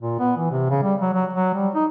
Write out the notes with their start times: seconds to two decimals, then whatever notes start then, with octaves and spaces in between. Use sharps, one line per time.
0.01 A#2
0.19 B3
0.37 E3
0.51 C3
0.70 C#3
0.83 G3
1.01 F#3
1.13 F#3
1.33 F#3
1.55 G3
1.75 D#4